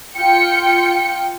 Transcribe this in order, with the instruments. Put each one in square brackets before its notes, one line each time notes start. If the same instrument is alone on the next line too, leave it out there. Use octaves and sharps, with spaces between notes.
[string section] F4 G5 C#7